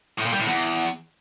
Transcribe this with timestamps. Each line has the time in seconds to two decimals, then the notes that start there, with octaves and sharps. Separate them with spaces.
0.19 A2
0.26 A#2
0.33 G3
0.40 A2
0.47 E2